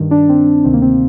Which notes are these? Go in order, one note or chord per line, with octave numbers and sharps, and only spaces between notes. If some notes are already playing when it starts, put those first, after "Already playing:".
Already playing: G2 D#3
D4
C4
D2 C3 D#3 C4
A#3
C4